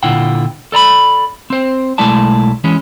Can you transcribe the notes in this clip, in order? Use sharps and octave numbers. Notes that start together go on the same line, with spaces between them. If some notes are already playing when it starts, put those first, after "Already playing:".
A#2 D3 E4 F4 F#5 G5
A4 D5 A#5 B5
C4 C5
B1 G#3 A3 E4 D5 A5
E3 G#3 C#4